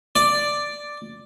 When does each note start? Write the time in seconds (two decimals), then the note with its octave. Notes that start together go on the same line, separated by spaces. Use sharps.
0.16 D5